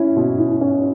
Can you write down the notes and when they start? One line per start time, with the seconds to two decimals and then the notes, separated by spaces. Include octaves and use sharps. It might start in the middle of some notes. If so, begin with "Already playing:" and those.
Already playing: C#4 E4
0.16 B2
0.38 E4
0.61 C#4